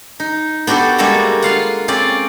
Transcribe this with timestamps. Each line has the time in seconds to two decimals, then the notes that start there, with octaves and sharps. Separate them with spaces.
0.20 D#4
0.67 B3 D4 F#4 G4 A4
0.98 G3 G#3 A#3 F#4 A4 B4
1.42 F4 F5 F#5
1.88 C4 C#4 F4 D5